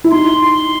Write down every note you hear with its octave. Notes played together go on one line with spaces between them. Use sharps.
E4
D#4 C6